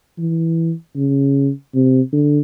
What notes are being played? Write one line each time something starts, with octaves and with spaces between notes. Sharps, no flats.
E3
C#3
C3
D3